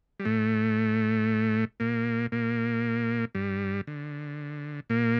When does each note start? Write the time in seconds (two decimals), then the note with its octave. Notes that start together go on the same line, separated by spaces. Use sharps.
0.20 G3
0.25 A2 A3
1.80 A#2 A#3
2.32 A#2 A#3
3.35 G2 G3
3.87 D3
4.90 A#2 A#3